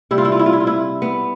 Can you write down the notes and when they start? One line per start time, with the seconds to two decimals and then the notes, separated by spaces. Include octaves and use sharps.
0.11 C3 G3 E4
0.18 F4
0.25 E4
0.32 F4
0.39 E4
0.46 F4
0.53 E4
0.60 F4
0.67 E4
1.02 B3